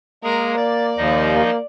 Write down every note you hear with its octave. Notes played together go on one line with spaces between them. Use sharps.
G#3 A#3 G#4 A#4
D5 A6
D#2 F3 D#4 D#5
A#3